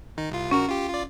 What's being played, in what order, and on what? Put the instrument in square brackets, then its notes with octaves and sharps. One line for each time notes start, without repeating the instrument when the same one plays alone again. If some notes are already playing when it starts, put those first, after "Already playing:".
[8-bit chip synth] D#3 D#4
C2 F4
[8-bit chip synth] A#1 F#4 A#4 [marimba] C#4
[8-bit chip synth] F4 G4
F4 D5